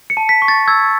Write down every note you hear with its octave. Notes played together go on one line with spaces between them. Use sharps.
C#7
A5
B6
C#6
A6
E6 G#6